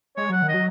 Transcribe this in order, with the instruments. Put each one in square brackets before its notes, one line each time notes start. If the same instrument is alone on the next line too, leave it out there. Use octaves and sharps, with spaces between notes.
[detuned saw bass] G#3 [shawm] C#5
[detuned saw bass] F#3 [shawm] F#5
[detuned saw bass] D#3
[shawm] D#5
[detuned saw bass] F#3